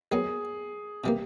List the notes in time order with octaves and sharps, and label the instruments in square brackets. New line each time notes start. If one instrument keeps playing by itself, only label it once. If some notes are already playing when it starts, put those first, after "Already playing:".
[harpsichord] D#3 F#3 B3 [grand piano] G#4
[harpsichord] C3 E3 G3 A#3 [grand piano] G4